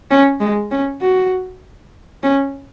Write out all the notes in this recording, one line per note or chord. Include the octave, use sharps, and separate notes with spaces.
C#4
G#3
C#4
F#4
C#4